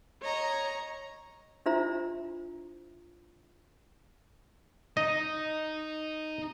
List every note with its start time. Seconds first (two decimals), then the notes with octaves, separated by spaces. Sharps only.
0.22 C#5 D#5 A#5
1.66 D4 E4 F4 C5 E5 A#5
4.97 D#4 D#5